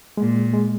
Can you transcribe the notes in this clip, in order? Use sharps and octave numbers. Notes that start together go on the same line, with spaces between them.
A#2 G#3
G#3